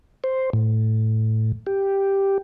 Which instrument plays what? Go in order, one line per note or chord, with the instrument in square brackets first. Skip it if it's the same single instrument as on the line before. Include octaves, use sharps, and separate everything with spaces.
[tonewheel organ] C5
A2
G4